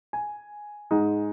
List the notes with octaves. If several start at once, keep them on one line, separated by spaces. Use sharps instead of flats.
G#5
G#2 G#3 D#4